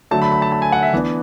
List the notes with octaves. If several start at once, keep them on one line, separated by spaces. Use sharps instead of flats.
D3 F#3 A3 A5
B5
B5
A5
A5
G#5
F#5
E5
E3 B3 D4